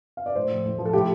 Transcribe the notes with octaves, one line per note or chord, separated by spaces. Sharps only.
F5
D5
A2 C5
F3
A2
F3
A4
A2 G4